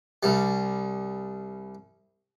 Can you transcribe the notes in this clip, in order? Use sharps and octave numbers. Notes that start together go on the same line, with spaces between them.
C2 G3